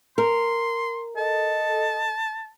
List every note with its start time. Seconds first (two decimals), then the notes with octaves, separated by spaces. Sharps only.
0.18 A#4 C6
1.17 A4 D#5 A5